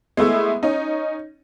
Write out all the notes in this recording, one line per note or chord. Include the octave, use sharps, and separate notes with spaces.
G#3 A3 B3 E4
C#4 D#4